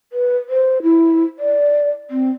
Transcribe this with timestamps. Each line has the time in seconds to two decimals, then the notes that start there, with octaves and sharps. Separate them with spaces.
0.13 B4
0.49 C5
0.83 E4
1.39 D5
2.10 C4